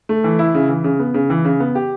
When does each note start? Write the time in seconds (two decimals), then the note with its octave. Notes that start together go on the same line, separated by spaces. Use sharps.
0.09 A3
0.24 E3
0.39 E4
0.55 C#3
0.69 E3
0.84 C#3
0.99 B3
1.14 C#3
1.30 E3
1.45 C#3
1.60 B3
1.75 G4